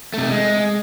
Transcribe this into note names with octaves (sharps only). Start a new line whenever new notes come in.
C3 A3
G#3